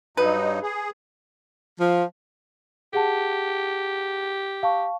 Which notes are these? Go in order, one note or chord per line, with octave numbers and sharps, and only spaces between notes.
G2 F#3 D#4 B4
G#4
F3
G4 G#4 F#5 A5
F5 A5 C#6